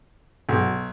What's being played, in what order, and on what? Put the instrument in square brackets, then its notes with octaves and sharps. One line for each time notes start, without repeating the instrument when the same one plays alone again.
[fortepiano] B1